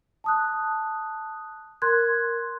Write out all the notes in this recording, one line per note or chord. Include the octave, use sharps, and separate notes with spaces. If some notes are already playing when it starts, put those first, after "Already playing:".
A5 D#6 F#6
A#4 C6 F#6 G#6